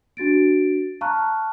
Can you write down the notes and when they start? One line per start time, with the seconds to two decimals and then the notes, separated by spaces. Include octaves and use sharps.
0.17 D4 F#4 A6 D7
1.01 F5 A5 A#5 C#6 F6 F#6